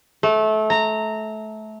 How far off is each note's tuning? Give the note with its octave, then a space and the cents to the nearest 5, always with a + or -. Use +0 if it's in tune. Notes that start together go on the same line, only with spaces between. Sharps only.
A3 -25
A#5 -15